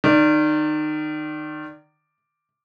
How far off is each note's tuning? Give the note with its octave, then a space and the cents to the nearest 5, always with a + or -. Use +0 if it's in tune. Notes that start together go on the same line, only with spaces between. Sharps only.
D#3 -25 D5 +0